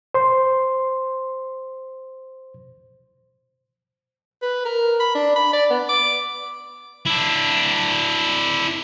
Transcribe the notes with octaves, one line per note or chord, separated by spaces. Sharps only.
C5 C6
B4
A#4
B5
D4
B5
D5
B3
D6
D4 E4